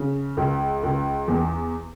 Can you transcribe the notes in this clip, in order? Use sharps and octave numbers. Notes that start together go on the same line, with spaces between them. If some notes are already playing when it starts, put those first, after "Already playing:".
Already playing: C#3
C#2
C#2
E2